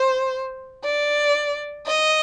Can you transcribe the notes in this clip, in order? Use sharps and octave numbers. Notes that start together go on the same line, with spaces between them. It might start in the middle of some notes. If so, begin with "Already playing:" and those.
Already playing: C5
D5
D#5